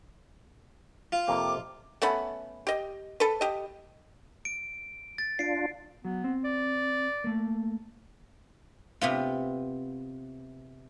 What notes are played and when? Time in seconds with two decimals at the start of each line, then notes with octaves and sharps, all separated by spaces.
1.12 F4
1.28 F2 C3 A#3 D6
2.02 A3 B3 C#4 B5
2.67 G4 D#5
3.20 A4 B4
3.41 G4 D#5
4.45 D7
5.18 A6
5.39 D4 F4 C7 D7
6.05 F#3 B3
6.24 C4
6.44 D5
7.24 A3 A#3
9.01 C3 B3 F4